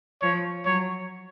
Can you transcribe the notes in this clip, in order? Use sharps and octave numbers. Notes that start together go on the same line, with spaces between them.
F3 C#5
F#3 C#5